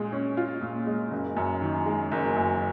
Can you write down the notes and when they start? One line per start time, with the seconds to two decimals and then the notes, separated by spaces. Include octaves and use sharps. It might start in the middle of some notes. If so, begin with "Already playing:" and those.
Already playing: A#2 G#3
0.12 C#4
0.37 F4
0.62 A#2
0.87 G#3
1.11 F#1
1.37 F#2
1.62 D#3
1.86 G#3
2.11 F#1
2.36 F#2